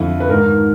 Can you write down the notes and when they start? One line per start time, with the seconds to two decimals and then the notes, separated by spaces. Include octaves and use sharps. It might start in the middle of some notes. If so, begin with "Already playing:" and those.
Already playing: F2 D3 E4 F4
0.20 B4
0.29 G#2 D#3 A#4